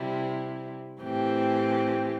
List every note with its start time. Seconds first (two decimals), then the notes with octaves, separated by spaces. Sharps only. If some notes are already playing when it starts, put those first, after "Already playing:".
Already playing: C3 G3 E4
1.01 A2 E3 C4 G4